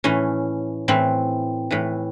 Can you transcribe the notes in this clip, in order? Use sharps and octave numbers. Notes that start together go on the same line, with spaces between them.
A2 E3 C#4
A2 E3 C4
A2 E3